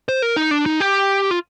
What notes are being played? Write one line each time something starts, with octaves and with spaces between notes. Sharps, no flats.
C5
A#4
D#4
D4
D#4
G4
F4